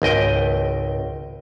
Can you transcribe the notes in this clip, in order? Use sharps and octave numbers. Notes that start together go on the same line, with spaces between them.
G#1 C#2 D#5 G5